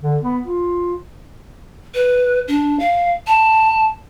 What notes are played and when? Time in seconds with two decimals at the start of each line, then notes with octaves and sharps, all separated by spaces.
0.02 D3
0.23 B3
0.46 F4
1.94 B4
2.48 D4
2.80 F5
3.27 A5